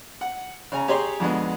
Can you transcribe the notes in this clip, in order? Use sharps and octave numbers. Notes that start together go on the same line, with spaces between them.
F#5
C#3 G#5 A#5
G4 G#4 C#5 A#5 C6
F2 D3 G#3 B3